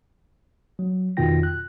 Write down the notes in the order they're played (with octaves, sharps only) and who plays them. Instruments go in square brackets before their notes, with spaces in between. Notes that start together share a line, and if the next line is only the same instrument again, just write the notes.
[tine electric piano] F#3
F2 B2 D#3 F4 G5 A#6
F#6